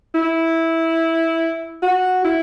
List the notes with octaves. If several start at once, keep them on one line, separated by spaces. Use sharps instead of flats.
E4
F#4
E4